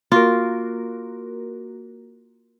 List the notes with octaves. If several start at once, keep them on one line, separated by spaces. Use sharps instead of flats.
A#3 F4 F#4 A#4